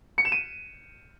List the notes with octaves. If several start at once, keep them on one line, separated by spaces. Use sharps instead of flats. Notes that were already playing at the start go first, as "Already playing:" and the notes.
C#7
E7
D#7